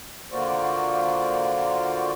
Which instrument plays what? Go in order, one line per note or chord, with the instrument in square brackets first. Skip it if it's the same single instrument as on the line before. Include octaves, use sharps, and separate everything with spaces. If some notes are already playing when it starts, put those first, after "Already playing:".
[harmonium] D3 A#3 F4 F#4 C5 D5